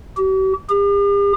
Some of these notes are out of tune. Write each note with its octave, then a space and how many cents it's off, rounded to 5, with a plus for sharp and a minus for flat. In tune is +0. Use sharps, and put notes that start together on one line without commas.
G4 -45
G4 +45